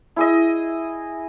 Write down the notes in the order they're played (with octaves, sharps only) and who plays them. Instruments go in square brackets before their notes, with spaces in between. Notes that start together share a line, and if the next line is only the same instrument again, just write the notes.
[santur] E4 G#4 D#5